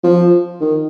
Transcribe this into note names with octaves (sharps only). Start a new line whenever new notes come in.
F3
D#3